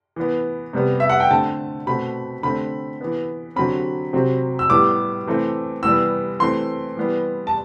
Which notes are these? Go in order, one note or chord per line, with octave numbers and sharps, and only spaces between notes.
E3 B3
C3 G3 B3
E5
F#5
G5
D3 A3 C4 A5
B2 A3 C4 B5
D3 A3 C4 B5
E3 B3
D3 F#3 C4 B5
C3 F#3 C4
E6
A2 G3 B3 D6
E3 A3 C4
E3 G3 B3 E6
E3 A3 C4 C6
E3 G3 B3
A5